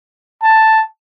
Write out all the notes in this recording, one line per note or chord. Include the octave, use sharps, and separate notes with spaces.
A5